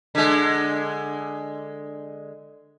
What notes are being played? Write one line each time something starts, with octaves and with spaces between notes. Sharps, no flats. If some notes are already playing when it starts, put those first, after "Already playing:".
D3 G#3